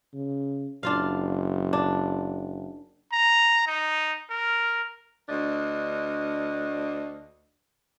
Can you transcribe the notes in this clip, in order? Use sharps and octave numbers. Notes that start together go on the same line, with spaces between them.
C#3
F#1 D4 F4 F5
D4
A#5
D#4
A#4
D2 D4 D#5